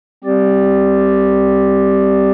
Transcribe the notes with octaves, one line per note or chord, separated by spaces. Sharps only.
G3 C4 G4 D5